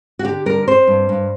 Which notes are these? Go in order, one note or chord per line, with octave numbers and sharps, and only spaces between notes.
F#4
D3 G4
G3 A#4
C4 C5
G2
G2